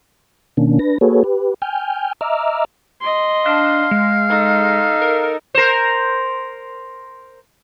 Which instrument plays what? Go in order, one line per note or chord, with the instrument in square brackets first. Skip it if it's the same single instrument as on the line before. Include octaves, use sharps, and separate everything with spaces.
[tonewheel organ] B2 D#3 A#3 C#4 D4
D4 B4 A#6
A#3 F#4 G#4 A4 B4 C#5
G4 B4
G5 G#5 F6 G6
D#5 E5 A#5 D6 E6 F6
[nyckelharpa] D#5 C6
[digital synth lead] D4 [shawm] F5
[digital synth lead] G#3
[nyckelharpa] D#4 A4
[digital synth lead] A#4
[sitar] A#4 C5